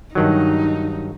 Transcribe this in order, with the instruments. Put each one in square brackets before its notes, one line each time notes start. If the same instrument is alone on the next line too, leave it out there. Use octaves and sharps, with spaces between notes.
[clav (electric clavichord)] G2 D#3 F#3 [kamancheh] D#4